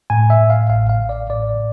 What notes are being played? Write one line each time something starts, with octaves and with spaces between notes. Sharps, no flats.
A2 G#5
E5
A2
F5
A1 F5
F5
A1
D5
A2 D5